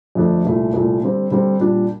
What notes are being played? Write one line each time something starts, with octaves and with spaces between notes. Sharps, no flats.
F2 D3 A3 D4
C2 A#2 A3
C2 A#2 A3
D3 G3 C4
D3 G3 C4
A#2 G3 D4